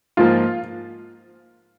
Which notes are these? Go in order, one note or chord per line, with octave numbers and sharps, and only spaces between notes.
G#2 F3 A#3 F4